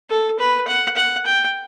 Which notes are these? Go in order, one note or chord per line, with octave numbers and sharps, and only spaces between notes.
A4
B4
F#5
F#5
G5